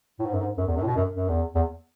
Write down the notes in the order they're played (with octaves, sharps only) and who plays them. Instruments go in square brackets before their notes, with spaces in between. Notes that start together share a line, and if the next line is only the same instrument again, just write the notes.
[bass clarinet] A2
G#2
F#2
G#2
F#2
E2
F#2
A2
B2
F#2
F#2
E2
E2